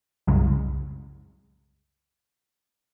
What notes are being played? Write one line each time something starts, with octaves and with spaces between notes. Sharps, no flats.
C2 F#2 C#3 F#3 G#3